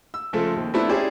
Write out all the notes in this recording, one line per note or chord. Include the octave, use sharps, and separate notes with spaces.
E6
C#3 F3 G#3 A3 A4
D#2
A3 B3 C4 D4 E4
C#4 E4 G4 G#4 C5 D5